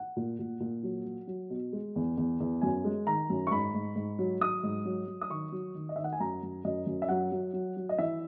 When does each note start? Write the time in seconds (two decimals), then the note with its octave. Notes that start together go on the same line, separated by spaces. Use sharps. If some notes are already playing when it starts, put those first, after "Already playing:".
Already playing: F#5
0.16 A#2
0.39 A#2
0.60 A#2
0.83 F#3
1.05 F#3
1.27 F#3
1.50 B2
1.73 G#3
1.96 E2
2.17 E2
2.40 E2
2.61 F#2 G#5
2.84 G#3
3.07 D#3 A#5
3.30 F#2
3.47 C#6
3.51 G#2 B5
3.74 G#2
3.96 G#2
4.19 F#3
4.41 F#3 D#6
4.63 G#2
4.85 F#3
5.08 F#3
5.21 D#6
5.30 D#3 C#6
5.52 F#3
5.74 D#3
5.89 D#5
5.96 D#3 E5
6.04 F#5
6.13 G#5
6.20 F#2 A#5
6.43 F#2
6.64 F#2 D#5
6.86 F#2
7.02 E5
7.09 F#3 F#5
7.32 F#3
7.53 F#3
7.77 F#3
7.89 D#5
7.98 E3 E5